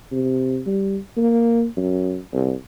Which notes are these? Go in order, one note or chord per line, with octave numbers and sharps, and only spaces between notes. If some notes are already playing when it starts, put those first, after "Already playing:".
C3
G3
A#3
F#2
C2